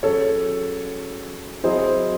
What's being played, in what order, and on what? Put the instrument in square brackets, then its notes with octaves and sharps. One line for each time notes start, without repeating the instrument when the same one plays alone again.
[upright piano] F#3 C#4 G#4 [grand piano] A4 C#5
[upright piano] F#3 C4 E4 G#4 [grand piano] C5 D#5